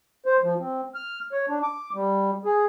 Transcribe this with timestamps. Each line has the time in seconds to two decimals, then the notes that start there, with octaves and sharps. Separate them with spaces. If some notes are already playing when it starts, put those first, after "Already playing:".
0.26 C5
0.43 F3
0.59 C4
0.95 F6
1.32 C#5
1.49 D4
1.63 D6
1.94 G3
2.45 G#4